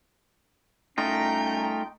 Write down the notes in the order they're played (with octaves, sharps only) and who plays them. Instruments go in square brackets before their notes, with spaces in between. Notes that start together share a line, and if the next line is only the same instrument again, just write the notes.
[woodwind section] C2 C#4 A#5 [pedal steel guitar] A3 D#4 F4 [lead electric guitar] G5